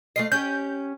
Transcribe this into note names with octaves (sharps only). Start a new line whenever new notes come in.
A3 F4 D#5 C7
C#4 G4 G6